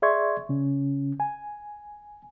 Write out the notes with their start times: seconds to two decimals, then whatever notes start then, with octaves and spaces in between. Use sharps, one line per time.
0.02 G#4 D5 E5 C6 C#6 G#6
0.49 C#3 C#4
1.20 G#5